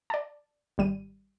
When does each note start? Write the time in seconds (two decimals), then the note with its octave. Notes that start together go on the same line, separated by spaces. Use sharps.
0.10 D5 A5
0.78 G#1 G3 D#7